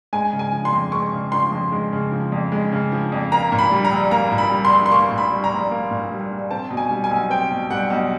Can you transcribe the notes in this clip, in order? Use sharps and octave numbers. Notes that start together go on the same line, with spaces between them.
G#3 G#5
C#3
G#5
F3
C6
F2
G#3 C#6
C#3
F3 C6
F2
G#3
C#3
F3
F2
G#3
C#3
F3
F2
A#3 A#5
A#2
B5
G3
A#5
A#1
A#3 A#5
A#2
B5
G3
C6
A#1
C6
A#3 C#6
A#2
B5
G3
A#5
A#1
A#3
A#2
G3
A#1
C4 A5
B2
G#5
G3
G#5
B1
C4 G5
B2
G3 F#5
B1